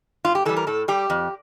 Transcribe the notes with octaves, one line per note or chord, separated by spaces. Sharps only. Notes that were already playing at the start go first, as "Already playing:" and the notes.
G2 F4
G4
E3 G3 A4
A#4
A2 A4
G3 G4
F2